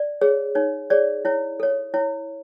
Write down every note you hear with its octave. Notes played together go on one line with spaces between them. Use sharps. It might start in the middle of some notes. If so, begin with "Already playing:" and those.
Already playing: D5
G#4 C#5
D#4 C#5
G#4 C#5 D5
E4 C#5
A4 C#5
E4 C#5